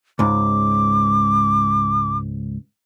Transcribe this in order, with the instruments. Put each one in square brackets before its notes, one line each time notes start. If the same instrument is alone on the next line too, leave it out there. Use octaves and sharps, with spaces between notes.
[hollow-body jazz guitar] C#2 G#2 [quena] D6